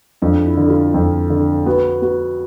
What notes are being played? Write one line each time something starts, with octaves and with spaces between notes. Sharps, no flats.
F2 D4
E4
D3
F4
F2
D3
B3 F#4
B3 F#4